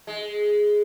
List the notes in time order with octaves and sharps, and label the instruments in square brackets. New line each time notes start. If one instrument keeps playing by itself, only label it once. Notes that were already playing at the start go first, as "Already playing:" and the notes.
[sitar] G#3